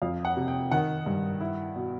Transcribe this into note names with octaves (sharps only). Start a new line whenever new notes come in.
F2 F5
F#5
C3
G5
D#3 F#5
G2
E4
B2